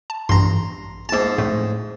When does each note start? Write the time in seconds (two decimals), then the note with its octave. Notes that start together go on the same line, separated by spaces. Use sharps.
0.10 A5
0.29 A1 G2 A#5 C6
1.09 G#2 A#3 A5 E7
1.38 F2 A2 A3